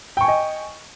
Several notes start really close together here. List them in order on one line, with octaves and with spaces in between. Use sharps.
G5 C#6 G#5 D#5